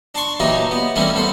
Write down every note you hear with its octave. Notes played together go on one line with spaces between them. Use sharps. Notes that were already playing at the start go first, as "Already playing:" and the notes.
D4 A5 C6 C#6
A#2 E3 F#3 A#3 D#4 G4
B3
E3 G3 A3 A#3 C4 C#4
A1 B3 A4 C5